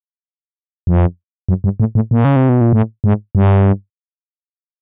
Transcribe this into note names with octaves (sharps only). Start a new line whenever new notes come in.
F2
F#2
G2
A2
A2
A#2
C#3
C3
B2
A#2
A2
G#2
G2